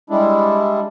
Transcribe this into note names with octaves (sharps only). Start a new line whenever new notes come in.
G3 G#3 D4 E4